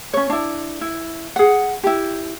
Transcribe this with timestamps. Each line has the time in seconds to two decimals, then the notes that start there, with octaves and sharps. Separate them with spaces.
0.14 C#4 C#5
0.30 D4 E4
0.81 E4
1.36 G#4 F#5
1.83 E4 G4